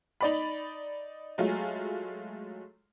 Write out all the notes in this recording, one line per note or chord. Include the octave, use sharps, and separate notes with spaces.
D#4 D5 B5
F#3 G#3 A3 F4